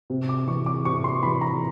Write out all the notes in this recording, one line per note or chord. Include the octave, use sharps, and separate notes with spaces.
C3
D6
E3 C#6
D6
C3 C#6
C6
E3 B5
A#5